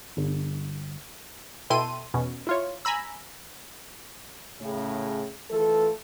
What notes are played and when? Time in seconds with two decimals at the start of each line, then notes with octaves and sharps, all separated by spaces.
0.17 G1
1.70 B2 E4 A4 G5 C6 D#7
2.14 E2 B2 C#4
2.47 E4 F4 C#5
2.85 G#5 A#5 B5 E6
4.60 A2 C#3
5.50 E3 A3 F4 A4